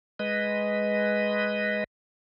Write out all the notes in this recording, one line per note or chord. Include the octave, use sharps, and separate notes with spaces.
G#3 B4 D#5